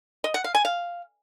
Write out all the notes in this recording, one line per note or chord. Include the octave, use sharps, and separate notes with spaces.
D#5
F#5
F5
G#5
F5